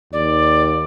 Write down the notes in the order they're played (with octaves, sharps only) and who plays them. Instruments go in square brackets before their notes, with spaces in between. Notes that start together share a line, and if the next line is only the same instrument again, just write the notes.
[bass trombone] D#2 [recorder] D5